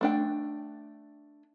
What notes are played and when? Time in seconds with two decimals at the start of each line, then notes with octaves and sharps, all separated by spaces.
0.01 A3 D4 G5